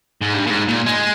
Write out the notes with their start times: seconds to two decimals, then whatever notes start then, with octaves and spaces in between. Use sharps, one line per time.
0.22 G#2
0.34 G2
0.47 A#2
0.51 G#2
0.68 A#2
0.86 G#3